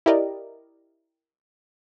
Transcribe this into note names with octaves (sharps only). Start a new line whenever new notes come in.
E4 G4 A#4 D5 D#5